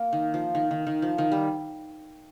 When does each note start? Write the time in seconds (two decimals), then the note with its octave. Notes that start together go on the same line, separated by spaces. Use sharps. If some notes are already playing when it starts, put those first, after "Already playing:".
Already playing: A#3
0.13 D#3
0.34 F3
0.55 D#3
0.71 D#3
0.87 D#3
1.02 F3
1.18 D#3
1.32 G3